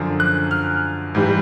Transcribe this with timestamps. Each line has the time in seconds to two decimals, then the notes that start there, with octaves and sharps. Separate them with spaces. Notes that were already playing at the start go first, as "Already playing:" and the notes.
Already playing: F#2 D3 F3
0.20 F#6
0.51 F6
1.15 G#2 E3 G3